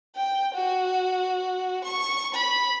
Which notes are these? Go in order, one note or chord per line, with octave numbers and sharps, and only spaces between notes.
G5
F#4
C#6
B5